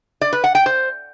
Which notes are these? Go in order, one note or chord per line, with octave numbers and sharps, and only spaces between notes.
D5
B4
F#5
G5
C5